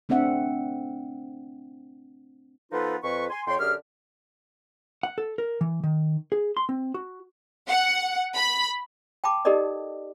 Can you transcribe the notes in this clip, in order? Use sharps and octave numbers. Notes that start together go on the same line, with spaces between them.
A3 C4 D4 E5 F#5
F3 B3 D#4 F4 A4 B4
F2 B4 C#6
G#5 C6
F2 C#5 G5 C6
F#2 D3 G4 G#4 F6
F#5
A4
A#4
E3
D#3
G#4
C6
C4
F#4
F#5
B5
G5 A5 B5 D6
D#4 G4 A4 A#4 D5 D#5